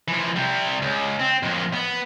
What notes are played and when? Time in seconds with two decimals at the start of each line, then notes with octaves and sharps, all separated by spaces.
0.08 E3 F3
0.36 C3 G3
0.82 C#2
1.20 C4
1.43 F2 A#2
1.73 B3